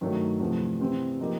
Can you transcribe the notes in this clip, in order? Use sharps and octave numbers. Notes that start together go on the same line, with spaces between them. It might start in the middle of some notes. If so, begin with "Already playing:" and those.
G2 D#3 F#3 A3
E2 C3 F3 A3
C3 E3 G3 C4
F3 A#3 D#4 G4